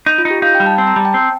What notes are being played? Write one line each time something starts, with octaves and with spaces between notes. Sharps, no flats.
D#4
F4
D#4
G4
D#4 F5
G5
G3
A5
C4 A5
A#5
G3 A5
G5
C4